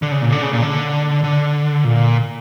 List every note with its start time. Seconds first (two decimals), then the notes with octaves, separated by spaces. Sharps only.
0.02 D3
0.12 C#3
0.22 A#2
0.32 D3
0.43 C#3
0.53 A#2
0.62 D3
1.24 D3
1.84 A#2